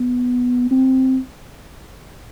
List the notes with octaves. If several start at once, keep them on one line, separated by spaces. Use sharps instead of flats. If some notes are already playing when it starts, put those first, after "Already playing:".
Already playing: B3
C4